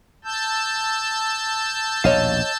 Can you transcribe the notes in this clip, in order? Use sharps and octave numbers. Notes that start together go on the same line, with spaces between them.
A5 E6 G6
A#1 D#2 B2 C#5 D#5 F5